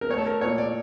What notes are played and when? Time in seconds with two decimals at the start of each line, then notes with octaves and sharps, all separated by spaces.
0.01 A#4
0.10 A3 C#5
0.18 A4
0.26 A#4
0.41 A#2 C#5
0.58 D5